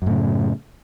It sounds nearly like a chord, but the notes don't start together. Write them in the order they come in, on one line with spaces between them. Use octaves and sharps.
F#2 A2 C#3